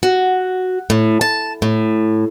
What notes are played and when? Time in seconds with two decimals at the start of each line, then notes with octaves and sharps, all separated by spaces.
0.03 F#4
0.90 A2
1.21 A5
1.62 A2